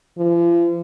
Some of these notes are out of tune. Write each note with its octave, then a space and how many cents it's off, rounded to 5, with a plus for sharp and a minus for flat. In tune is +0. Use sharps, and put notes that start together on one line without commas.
F3 -40